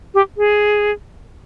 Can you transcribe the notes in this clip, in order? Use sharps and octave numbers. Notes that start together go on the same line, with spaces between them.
G4
G#4